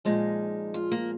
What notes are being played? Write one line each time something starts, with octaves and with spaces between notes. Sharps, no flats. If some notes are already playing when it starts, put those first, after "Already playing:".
A#2 F3 G#3 D#4
F4
A#3